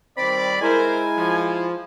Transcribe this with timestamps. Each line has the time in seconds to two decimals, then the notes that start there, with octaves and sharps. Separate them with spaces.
0.17 D#3 G3 C4 D5 B5
0.61 G#3 E4 A#4 C5 G#5
1.17 F3